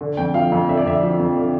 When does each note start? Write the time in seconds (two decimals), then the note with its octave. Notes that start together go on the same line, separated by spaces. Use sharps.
0.01 D3
0.17 F2 G5
0.34 F3 F5
0.52 F2
0.69 D3 E5
0.77 D5
0.85 F2 E5
1.03 F3
1.19 F2
1.36 D3